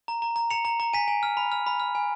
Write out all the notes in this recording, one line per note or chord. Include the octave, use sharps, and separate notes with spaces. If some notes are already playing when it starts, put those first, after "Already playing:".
A#5
A#5
A#5
A#5 C#7 F7
A#5
A#5
G#5 B6 D#7
G#5
F6
B5
F6
B5
F6
G#5